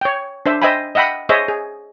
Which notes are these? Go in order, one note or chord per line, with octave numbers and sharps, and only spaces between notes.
C#5 G5
D4 C5 E5
C5 D#5 E5 G5 G#5 B5
D#5 E5 F#5 G5 B5
G#4 C5 C#5 D#5 E5
G#4